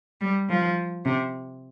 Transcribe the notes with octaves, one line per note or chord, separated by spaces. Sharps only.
G3
F3
C3